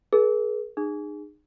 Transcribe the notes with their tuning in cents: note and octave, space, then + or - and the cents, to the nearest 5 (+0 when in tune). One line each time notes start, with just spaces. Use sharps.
G#4 +30 B4 -45
D#4 -40 G#4 -15